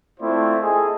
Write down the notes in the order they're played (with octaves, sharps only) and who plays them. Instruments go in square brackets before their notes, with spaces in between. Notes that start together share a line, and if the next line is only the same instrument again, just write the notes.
[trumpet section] A3 C4 E4 F4 C5 D5
G#4 A4 D#5 G#5